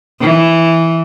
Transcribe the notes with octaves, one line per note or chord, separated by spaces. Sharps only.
E3